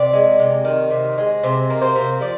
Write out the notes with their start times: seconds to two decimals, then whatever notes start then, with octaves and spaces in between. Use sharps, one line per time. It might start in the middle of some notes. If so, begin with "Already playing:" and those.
Already playing: C3 D5
0.13 G#3
0.39 C3
0.65 D#3
0.91 C3
1.18 G#3
1.43 C3 C5
1.70 A#3
1.82 C5
1.96 C3
2.21 F3 D5